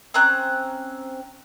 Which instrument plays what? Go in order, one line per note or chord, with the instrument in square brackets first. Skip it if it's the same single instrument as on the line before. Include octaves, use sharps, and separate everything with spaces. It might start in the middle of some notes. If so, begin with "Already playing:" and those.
[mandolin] C4 C#4 A#5 F#6